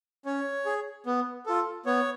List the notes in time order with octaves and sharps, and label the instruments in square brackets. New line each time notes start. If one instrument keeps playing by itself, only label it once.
[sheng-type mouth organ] C#4 C#5
G#4
B3
F4 A4
B3 C#5